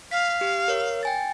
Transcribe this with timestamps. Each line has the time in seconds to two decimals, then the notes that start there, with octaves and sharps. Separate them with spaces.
0.11 F5 B6
0.41 G4
0.68 A#4 C#5
1.03 G5 G#5 A6